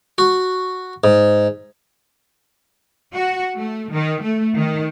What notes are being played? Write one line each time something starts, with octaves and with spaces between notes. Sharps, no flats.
F#4
G#2
F#4
A3
D#3
A3
D#3